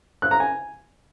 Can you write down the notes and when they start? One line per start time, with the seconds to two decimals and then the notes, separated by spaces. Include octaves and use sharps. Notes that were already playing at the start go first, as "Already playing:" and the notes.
0.22 F#6
0.31 A#5
0.40 G#5